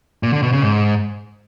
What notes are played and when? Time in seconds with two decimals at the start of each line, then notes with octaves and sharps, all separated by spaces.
0.23 A#2
0.33 D3
0.43 B2
0.53 C#3
0.62 G#2